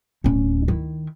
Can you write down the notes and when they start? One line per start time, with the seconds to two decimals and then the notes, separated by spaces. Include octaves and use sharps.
0.24 D1 C#4
0.68 D#3 E4